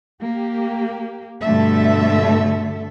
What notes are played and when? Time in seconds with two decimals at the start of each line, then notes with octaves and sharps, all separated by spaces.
0.22 A#3 G4
1.41 G2 B2 D3 A3 A4 E5